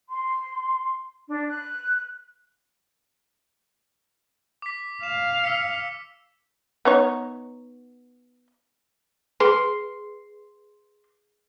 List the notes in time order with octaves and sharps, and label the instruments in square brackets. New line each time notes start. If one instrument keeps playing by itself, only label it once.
[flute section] C6
D4
F#6
[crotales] D6 B6
[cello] F5 [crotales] E7
[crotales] E6 B6 C#7
[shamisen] B3 D#4 C#5
[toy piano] G#4 B4 [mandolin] C6